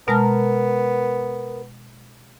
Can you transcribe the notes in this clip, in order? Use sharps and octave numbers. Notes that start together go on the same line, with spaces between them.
B2 G#3 B3 A#4 A5